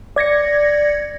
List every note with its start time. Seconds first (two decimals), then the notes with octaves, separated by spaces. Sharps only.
0.16 D5 G#6 A#6 C#7